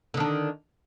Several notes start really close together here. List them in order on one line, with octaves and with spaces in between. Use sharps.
D3 D#3 D4